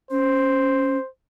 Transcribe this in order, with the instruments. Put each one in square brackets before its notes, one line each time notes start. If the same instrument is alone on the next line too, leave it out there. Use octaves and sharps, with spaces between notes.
[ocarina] C#4 [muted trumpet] C5